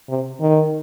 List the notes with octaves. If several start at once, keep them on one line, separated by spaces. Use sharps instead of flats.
C3
D#3